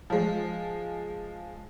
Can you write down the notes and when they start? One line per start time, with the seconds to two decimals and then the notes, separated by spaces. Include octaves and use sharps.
0.10 F3 G#3